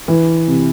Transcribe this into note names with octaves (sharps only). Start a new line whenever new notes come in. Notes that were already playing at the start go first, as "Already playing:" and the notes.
E3
C3